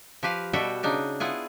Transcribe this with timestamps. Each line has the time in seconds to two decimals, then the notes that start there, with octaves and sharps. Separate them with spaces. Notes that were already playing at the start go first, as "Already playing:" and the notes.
0.23 F3 G4 B4 F5
0.53 B2 G3 F#4 A4 E5 G5
0.83 C#3 D4 D#4
1.20 B3 E4 F4 G#4